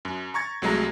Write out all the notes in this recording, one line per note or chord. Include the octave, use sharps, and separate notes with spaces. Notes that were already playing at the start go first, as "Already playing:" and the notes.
F#2
A#5 C#6 G#6 A6
C2 F#3 G#3 A3 A#5